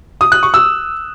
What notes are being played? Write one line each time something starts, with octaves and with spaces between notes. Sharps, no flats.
D#6
F#6
C#6
E6